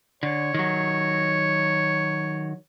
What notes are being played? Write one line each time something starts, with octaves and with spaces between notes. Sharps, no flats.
D3 C#5
D#3 F#3